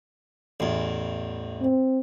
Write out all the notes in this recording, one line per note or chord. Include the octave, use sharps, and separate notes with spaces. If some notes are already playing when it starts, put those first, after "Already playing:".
A1 E2
C4